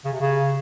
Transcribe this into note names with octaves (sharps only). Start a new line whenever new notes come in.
C#3
C3
C#3